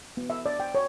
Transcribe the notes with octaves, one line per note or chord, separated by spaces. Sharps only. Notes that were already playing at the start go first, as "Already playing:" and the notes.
B3
E5
D5
G5
C#5